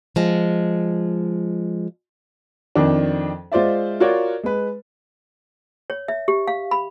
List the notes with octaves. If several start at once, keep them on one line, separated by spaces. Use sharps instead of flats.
F3 G#3
F2 D#3 D4
G#3 F4 C5 D5 E5
F4 F#4 A#4 C#5 D5
G#3 B4
C#5
E5
G4
F5
B5